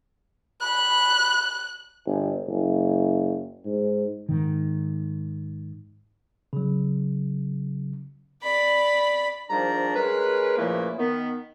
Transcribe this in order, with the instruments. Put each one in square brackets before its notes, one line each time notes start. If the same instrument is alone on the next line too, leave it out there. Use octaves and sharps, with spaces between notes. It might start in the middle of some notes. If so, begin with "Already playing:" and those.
[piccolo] B5 [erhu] F#6
[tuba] G1
F#1
G#2
[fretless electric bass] G#2 D#3
[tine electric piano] C#3 F#3
[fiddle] D5 B5
[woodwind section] G#2 D#3 F3 G3 D4 A#5
G#3 C#4 A#4 B4
A#2 C#3 E3 F3 A3 A#3
D#3 B3